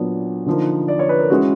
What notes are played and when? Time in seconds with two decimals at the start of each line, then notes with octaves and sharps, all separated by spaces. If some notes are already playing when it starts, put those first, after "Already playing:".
Already playing: A#2 F#3 B3 D4
0.46 D3 F3 A#3 D#4
0.88 D5
0.99 C#5
1.09 B4
1.20 A#4
1.30 E3 G#3 C#4 E4 F#4